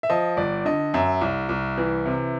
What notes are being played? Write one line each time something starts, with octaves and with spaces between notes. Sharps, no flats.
E5
F3 D#5
G1 D5
D3 D#5
F#2 E5
C2
C2
E3
C3